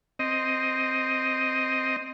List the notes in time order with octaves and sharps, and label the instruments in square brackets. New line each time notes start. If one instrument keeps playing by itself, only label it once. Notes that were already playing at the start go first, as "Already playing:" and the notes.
[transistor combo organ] C4 D#5